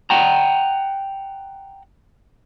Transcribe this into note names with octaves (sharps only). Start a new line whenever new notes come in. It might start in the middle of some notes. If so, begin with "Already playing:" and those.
F#5 G5 A#5